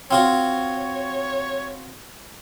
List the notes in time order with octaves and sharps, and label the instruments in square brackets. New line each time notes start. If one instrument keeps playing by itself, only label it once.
[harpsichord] C4 F4 F#4 [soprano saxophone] C#5